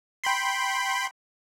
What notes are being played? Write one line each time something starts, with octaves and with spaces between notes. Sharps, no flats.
G5 B5 C6